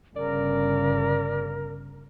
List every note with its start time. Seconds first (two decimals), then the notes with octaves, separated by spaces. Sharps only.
0.16 G1 C#3 A#4 D5